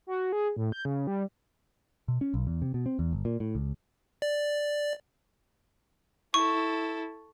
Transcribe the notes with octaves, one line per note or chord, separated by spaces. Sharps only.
F#4
G#4
A2
G6
C#3
G3
B2
C#4
B1
E2
C3
B2
C4
E2
G1
A#2
A2
C#2
D5
E4 A4 C#6